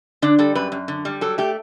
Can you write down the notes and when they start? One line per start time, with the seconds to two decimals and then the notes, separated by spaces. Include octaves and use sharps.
0.22 D3 D4
0.39 G3 A4
0.55 F#2 B4
0.72 F#2
0.88 D3
1.05 G3
1.21 F#3 A4
1.38 A3 G4